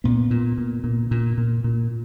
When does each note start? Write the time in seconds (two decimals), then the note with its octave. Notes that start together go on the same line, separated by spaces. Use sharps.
0.04 A#2 B3
0.31 A#2
0.58 A#2
0.84 A#2
1.11 A#2
1.38 A#2
1.64 A#2